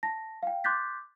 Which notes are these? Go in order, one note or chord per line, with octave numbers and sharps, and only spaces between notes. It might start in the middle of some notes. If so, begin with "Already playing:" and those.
A5 A#6
F5 G5
C6 D6 F#6 G6 A6 B6